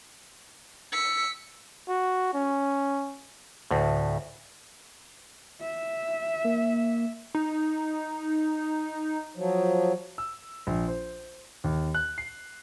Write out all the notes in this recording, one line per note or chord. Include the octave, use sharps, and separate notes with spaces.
E6 B6 C#7
F#4
C#4
D2 A2
E5
A#3
D#4
F3 F#3
E6
A#1
C5
D#2
F#6
C7